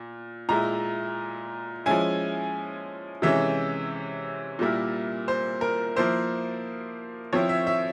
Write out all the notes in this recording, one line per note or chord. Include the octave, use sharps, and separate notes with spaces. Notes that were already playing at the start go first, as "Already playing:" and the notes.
Already playing: A#2
A#2 G#3 E4 A#5
F3 G#3 C#4 E4 G#5
C3 E3 G#3 C#4 E5
A#2 G3 A#3 E4
C5
A#4
F3 A#3 E4 C5
F3 C4 E4 C#5
E5
E5